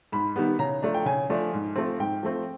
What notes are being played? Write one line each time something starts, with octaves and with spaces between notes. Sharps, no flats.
G#2 B5
D#3 G3 B3
C#3 A#5
F3 A3 D4
G5
C#3 G#5
F3 A3 D4
G#2
F3 A3 C4
G#2 G5
F3 A3 C4